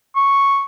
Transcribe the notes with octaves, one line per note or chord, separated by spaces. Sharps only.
C#6